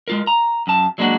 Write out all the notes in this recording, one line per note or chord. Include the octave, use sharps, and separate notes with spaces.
G#3 F4 A#4
A#5
F#2 A5
F#3 G#3 A#3 D4 F#4